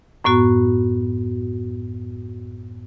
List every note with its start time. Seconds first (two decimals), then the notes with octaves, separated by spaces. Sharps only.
0.24 F#2 A2 B3 F#4